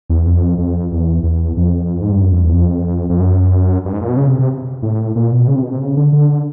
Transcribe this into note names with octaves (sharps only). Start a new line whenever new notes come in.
E2
F2
F2
E2
E2
F2
G#2
G2
F#2
F2
E2
F2
F2
F#2
G2
G#2
A#2
B2
C#3
C3
C3
A2
A#2
B2
C#3
C3
B2
C3
C#3
D3
D3